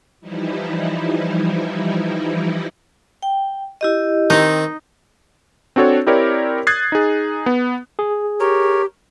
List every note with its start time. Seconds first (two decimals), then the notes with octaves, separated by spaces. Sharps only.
0.21 E3 F3 G3 D#4 E4
3.22 G5
3.81 E4 G4 D#5
4.30 D#3 C4 D#4
5.76 C4 D4 F#4 A4 C#5
6.06 C4 E4 G4 A#4 C#5 D5
6.67 D#6 F#6 G#6 A6 C7
6.92 D#4 G#4
7.46 B3
7.99 G#4
8.40 G4 A#4 C#5